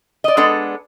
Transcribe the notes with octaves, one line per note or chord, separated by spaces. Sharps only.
D5 D#5
G#3 B3 D4 A4